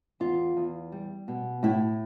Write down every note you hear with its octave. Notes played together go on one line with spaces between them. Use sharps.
E2 F4
E2
G3
B2
A2 E4